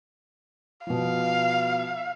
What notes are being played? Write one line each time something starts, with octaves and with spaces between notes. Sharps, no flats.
B2 F3 F5